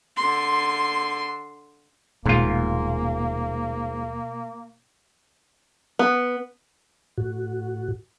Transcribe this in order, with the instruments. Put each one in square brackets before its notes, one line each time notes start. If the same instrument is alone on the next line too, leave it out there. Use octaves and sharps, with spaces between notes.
[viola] D3 C6
[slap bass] D#1 G#3 [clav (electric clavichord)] G#2 F4 [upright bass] B2 [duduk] A#3
[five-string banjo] B3
[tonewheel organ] A2 F#4